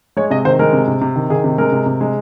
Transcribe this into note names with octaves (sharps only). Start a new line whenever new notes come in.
G#3 C#5
C3 D#5
D#3 C5
G#3 A#4
C3
C3
C3
D#3
D#3 G#4
C3
G#3 A#4
C3
C3
G#3